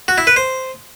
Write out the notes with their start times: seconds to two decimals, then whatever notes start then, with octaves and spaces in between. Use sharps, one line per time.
0.08 F#4
0.18 E4
0.27 B4
0.36 C5